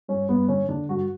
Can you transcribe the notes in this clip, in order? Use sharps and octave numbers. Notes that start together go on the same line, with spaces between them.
G2 C#4
G2 B3
D3 C#4
D3 D4
G2 F#4